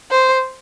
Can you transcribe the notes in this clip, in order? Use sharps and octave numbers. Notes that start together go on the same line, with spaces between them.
C5